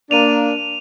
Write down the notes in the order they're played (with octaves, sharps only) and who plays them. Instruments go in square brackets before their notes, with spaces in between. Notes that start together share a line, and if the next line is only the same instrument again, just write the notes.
[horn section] A#3 D4 [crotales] D#7 F7